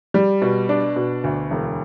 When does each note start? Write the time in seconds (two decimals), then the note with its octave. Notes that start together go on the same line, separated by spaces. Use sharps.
0.14 G3
0.42 B2
0.69 D4
0.96 B2
1.24 D2
1.51 E1